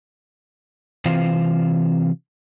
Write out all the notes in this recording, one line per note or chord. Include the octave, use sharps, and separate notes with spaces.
C3 E3 C4 F4 C5 F5